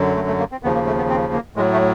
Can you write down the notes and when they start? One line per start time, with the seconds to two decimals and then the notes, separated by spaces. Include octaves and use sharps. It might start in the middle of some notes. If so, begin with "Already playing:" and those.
Already playing: F#2 D3 F#3
0.16 A3
0.28 A3
0.39 A#3
0.52 C4
0.63 D#2 C#3 F3 B3
0.75 A#3
0.87 A3
0.98 B3
1.09 C4
1.33 A#3
1.56 A2 F#3 G#3
1.73 A3